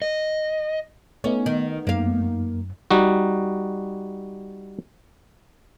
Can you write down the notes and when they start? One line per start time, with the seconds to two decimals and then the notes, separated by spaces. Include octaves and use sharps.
0.02 D#5
1.24 A3 B3 C#4 D#4
1.46 D#3
1.87 F#2 A#3 F5
2.91 G3 D#4 F#4